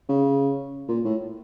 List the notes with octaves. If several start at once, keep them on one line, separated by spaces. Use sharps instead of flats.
C#3
A#2
A2